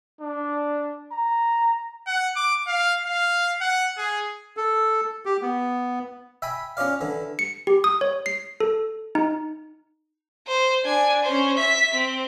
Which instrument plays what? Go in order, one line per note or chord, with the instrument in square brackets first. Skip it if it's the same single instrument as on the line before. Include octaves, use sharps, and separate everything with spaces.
[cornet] D4
A#5
[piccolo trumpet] F#5
D6
F5
F5
F#5
G#4
[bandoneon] A4
G4
B3
[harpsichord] E5 G5 G#5 B5
C#4 F4 D5 F5
D3 E3
[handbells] C#7
G4
D#6
C#5
C7
A4
D#4
[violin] C5
D4 G#5
C#4 C5
E5 B6
C4